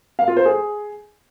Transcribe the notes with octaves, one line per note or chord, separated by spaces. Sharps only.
F5
F4
C5
G#4